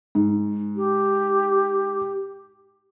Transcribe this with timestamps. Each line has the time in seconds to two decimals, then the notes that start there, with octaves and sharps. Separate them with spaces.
0.15 G#2
0.76 G4